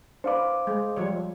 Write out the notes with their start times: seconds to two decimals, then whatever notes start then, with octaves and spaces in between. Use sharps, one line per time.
0.24 D4 B4 C5 F5 D6
0.67 G#3
0.96 F3 G3 C#5